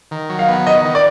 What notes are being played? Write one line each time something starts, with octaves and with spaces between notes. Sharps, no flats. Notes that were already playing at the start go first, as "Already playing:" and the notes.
D#3
F#3
F5
B3
D#3 D#5
D#3
D5